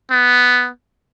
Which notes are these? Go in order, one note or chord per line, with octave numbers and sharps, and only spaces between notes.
B3